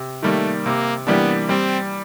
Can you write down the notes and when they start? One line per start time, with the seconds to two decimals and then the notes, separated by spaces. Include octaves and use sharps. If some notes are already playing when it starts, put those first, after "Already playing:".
Already playing: C3
0.23 D#3 G3 A3 A#3
0.65 C3 A#3
1.07 E3 G3 A#3 B3 D4
1.49 G3 C4